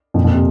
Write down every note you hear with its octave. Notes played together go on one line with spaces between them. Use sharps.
F2 A#2
F2 A#2
C3